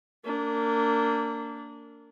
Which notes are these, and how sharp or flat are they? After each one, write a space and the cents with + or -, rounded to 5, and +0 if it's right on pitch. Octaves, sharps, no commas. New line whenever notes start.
A#3 -25 D4 -25